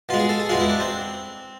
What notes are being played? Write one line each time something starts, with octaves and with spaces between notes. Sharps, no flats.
B2 G#3 F4
G#4
A4
G#4
E2 B2 G#3 F4
E4
D4
C4